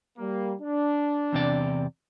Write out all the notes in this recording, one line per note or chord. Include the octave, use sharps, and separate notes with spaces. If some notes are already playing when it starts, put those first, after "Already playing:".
G3 A#3
D4
E2 C3 D5